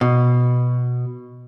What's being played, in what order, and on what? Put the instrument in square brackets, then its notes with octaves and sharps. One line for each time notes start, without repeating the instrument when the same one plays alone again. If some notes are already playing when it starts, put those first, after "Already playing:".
[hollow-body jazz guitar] B2